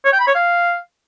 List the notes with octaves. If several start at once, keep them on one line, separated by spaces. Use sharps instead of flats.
C#5
G5
B5
C#5
F5